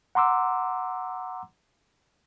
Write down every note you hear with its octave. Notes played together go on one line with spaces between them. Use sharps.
F#5 A#5 C6 D6 E6